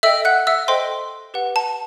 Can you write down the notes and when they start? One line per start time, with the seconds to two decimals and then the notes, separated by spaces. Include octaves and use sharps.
0.03 A4 D#5 E5 G5 E6
0.25 F#5 F#6
0.47 E5 E6
0.68 A4 C5 D#5 G5 C6
1.34 G4 B4 F#5
1.56 A5